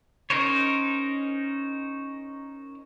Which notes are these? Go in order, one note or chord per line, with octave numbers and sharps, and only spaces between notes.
C#4 D#4 A#4 C5 C#5